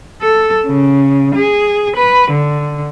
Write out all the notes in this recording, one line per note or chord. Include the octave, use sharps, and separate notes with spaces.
A4
C#3
G#4
B4
D3